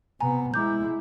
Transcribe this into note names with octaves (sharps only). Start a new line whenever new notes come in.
C3 B3 G#5 A#5
G#3 E4 A#5 D6 G6